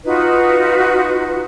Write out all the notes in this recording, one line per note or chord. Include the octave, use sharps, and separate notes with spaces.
D#4 F4 F#4 B4